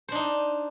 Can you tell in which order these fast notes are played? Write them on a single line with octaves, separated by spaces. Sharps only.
C5 D4 D#4